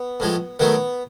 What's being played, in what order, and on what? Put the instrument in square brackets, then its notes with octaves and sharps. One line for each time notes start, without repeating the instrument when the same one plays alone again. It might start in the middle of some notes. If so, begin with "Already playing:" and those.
Already playing: [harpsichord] B3
A2 F3 G#3
D#3 F#3 A3 B3